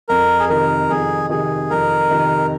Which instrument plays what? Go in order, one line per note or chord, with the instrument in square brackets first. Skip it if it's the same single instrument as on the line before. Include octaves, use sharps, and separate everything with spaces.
[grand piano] F2 [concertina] A#4
[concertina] G#4
[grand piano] C3 D#3 [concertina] A#4
[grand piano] F2 [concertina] G#4
[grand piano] C3 D#3 [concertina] G#4
[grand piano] F2 [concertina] A#4
[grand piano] C3 D#3